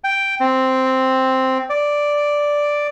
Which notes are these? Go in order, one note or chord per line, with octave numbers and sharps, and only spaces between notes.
G5
C4
D5